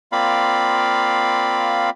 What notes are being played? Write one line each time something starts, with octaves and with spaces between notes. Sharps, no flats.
A#3 C4 F4 D5 F5 B5